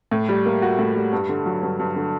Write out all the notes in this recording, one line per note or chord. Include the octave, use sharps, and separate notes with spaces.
A2
G3
A#3
F#4
A2
G3
G2
D3
F#3
G2
G2
D3